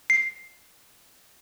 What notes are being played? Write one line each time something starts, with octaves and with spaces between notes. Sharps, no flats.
C7